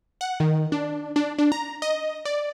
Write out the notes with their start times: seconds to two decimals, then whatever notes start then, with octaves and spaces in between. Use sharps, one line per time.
0.21 F#5
0.40 D#3
0.72 D4
1.16 D4
1.38 D4
1.52 A#5
1.82 D#5
2.25 D5